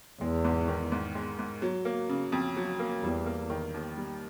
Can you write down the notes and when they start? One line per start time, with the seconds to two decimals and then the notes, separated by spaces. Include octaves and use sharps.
0.21 E2 G#3
0.44 G#2
0.68 D#3
0.92 G#2
1.15 G#3
1.39 G#2
1.62 F#3
1.85 A#3
2.09 C#3
2.32 F2
2.57 F#3
2.80 A#3
3.03 E2 G3
3.26 A#3
3.50 D#3
3.74 D#2
3.97 G3